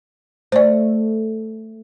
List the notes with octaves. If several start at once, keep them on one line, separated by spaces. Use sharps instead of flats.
A3 C5 D5